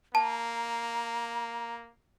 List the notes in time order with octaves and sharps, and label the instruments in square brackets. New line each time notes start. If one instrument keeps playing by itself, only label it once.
[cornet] A#3 [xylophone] A5 [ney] A#5